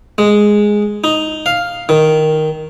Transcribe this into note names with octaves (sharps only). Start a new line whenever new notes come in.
G#3
D#4
F5
D#3